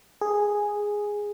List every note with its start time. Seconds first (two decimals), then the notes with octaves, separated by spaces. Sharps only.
0.21 G#4